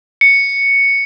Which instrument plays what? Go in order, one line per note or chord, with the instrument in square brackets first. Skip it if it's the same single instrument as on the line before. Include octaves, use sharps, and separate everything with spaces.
[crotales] C#7